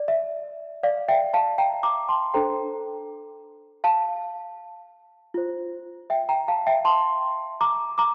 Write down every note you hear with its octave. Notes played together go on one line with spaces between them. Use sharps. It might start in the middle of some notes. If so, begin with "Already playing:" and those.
Already playing: D5
E5
D5 F5
E5 G5
F5 A5
G5 A#5
A#5 D6
A5 C6
D4 A4 C5 G5 A#5
F5 A5
F4 C5
E5 G5
G5 A#5
F5 A5
E5 G5
A5 C6
A#5 D6
A#5 D6